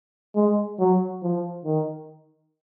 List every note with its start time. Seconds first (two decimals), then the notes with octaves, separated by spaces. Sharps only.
0.36 G#3
0.79 F#3
1.22 F3
1.65 D#3